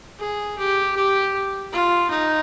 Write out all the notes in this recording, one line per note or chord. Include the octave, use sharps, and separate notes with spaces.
G#4
G4
G4
F4
D#4